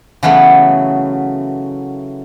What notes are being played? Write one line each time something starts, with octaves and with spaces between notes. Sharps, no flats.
C#3 E3 F#3 A3 B3